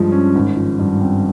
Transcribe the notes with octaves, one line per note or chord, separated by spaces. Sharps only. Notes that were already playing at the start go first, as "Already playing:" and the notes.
Already playing: G2 F3 G#3
C#4
G#1
F3
G2
C4